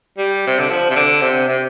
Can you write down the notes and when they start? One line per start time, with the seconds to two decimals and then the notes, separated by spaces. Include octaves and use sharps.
0.18 G3
0.47 C3
0.59 D3
0.69 F3
0.90 C3
0.96 D3
1.22 C3
1.48 C3